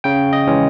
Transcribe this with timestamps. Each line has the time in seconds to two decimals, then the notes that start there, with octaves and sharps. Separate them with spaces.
0.04 C#3 G5
0.33 D#5
0.47 E3 G#3 C#4